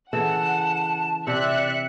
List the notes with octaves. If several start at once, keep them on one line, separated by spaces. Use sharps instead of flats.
C#3 E3 A4 F#5 A5 E7
C3 C4 D5 E5 F#6 C#7